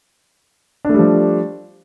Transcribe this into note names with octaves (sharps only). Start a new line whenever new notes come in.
F3 G3 A3 D4